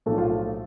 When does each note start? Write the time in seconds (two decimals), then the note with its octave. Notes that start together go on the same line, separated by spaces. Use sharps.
0.06 B1 A2 F3 A3 A4
0.18 F4